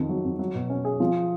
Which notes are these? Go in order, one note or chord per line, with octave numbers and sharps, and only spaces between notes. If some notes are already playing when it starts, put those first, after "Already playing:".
Already playing: F2 D#3
F#3
F2
F#3
B2
C#4
G#4
F3